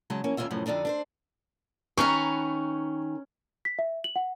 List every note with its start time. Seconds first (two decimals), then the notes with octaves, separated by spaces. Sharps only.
0.10 C#3 F#3 G#3 A5
0.24 E3 A#3 C#4
0.37 D#2 C#3 G3 A#3 F4 E5
0.51 F#2 A2 C3 F3
0.66 F2 B2 D3 D4 D#4
0.85 D4 A#4 C5
1.98 D#3 C#4 B4 G#5 A#5 C#6
3.65 B6
3.79 E5
4.04 F#7
4.16 F#5